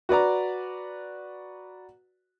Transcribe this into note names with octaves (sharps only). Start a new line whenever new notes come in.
F#4 B4 D5 A#5